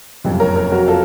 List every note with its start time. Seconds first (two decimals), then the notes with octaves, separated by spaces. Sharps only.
0.24 F#1 F2 C3
0.40 A#4 C#5
0.56 A#4 C#5
0.72 F#4 A#4
0.88 F4 A4